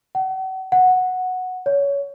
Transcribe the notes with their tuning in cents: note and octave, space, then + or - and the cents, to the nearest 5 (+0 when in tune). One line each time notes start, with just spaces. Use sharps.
F#5 +40
F#5 -5
C#5 +20